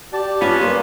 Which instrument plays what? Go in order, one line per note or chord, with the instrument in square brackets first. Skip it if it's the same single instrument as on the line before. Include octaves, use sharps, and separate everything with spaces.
[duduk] G4 [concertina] D5 A5
[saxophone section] B3 C#4 [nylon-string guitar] F4
[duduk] G3 [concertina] A#3 D5 C6 [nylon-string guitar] B4